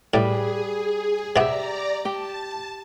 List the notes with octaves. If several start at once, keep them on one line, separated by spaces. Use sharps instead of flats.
A2 G3 G#4 B4
C3 B3 G4 D5 E5 A#5
G4 G5 A5